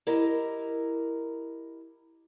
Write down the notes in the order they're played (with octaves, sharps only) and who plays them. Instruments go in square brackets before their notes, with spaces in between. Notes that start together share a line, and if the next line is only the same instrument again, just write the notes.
[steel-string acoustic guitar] E4 G4 A#4 D#5